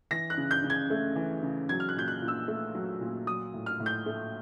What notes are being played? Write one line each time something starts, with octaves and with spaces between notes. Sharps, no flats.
E3 A#6
F#6
C#3
G6
C#3
G#6
A3
E3
C#3
F#3 G#6
F6
F#6
A#2 G6
F#6
A#2
E6
A3
F#3
A#2
F#3 D#6
A2
F6
A2
G6
A3